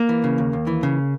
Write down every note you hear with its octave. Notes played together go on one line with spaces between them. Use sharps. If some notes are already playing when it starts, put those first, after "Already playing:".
Already playing: A#3
E3
C#3
D#2
D#2
E3
C#3